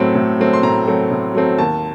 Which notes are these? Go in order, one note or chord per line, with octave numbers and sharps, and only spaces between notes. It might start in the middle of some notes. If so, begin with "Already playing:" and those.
Already playing: A2 F#3 A3 C4
A2
F#3 A3 C4
C6
A2 A#5
F#3 A3 C4
A2
F#3 A3 C4
D#2 A5